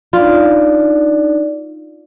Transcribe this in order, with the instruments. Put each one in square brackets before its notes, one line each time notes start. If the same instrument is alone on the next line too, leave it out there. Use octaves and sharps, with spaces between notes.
[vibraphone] D4 D#4 D5 [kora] F4